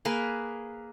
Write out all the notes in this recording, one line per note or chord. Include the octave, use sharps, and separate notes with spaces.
A#3 G#4 A#4 B4